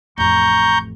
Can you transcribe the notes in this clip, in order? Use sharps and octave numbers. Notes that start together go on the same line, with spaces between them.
A1 F2 A#5 C#6 G6